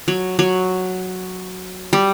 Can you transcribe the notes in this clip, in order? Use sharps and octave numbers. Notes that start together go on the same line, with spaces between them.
F#3
F#3
G3